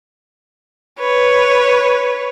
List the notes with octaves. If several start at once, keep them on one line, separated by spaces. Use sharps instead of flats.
B4 C#5